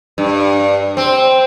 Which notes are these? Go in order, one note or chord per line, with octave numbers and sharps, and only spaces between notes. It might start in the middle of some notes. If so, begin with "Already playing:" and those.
G2
C4